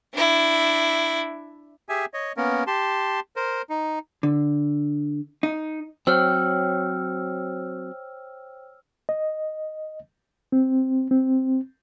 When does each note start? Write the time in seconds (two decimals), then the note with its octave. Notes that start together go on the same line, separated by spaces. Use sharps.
0.14 D4 E4
1.89 G4 G#4 E5 G#5
2.14 C#5 D#5
2.37 A#3 B3 C#4 A#4
2.67 G4 A5 C6
3.36 A#4 C5
3.70 D#4
4.23 D3
5.43 D#4
6.07 F#3 C4 C5 C#5 G5 E6 F6
9.09 D#5
10.52 C4
11.11 C4